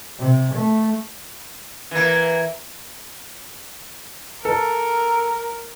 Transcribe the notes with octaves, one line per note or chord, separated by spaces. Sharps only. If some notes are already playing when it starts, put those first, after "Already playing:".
C3
A3
E3 A#3
A4 A#4